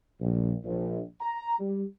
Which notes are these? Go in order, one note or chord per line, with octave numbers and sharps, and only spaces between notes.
A#1
A#1
A#5
G3